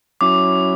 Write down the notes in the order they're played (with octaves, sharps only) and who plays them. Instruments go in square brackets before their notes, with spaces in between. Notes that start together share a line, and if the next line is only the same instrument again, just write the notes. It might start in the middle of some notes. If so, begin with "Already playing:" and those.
[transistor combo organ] F#3 C#4 E4 [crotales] D6